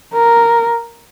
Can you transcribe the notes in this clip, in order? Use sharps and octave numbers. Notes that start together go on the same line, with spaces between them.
A#4